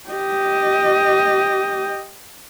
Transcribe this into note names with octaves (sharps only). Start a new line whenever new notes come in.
G4 D#5